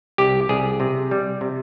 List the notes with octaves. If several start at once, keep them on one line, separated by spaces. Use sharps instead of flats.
C2 G4
C2 G#4
C3
G3
C3